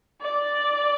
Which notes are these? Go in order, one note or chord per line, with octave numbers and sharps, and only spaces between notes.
D5